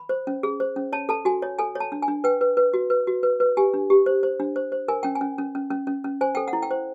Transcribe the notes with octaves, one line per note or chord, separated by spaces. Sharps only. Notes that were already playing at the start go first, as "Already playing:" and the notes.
Already playing: B5
C5
C#4
G#4
C5
C#4
C#5 A5
A4 A5
F#4 G#5
C#5
A4 G#5
C#5
A5
D4
G#5
D4
B4 G5
B4
B4
F#4
B4
F#4
B4
B4
G4 G#5
D4
G4
C5
C5
D4
C5
C5
A#4 G#5
C#4 G5
G#5
C#4
C#4
C#4
C#4
C#4
C#4
C5 G#5
A4 G5
F#5
E4
G5
C5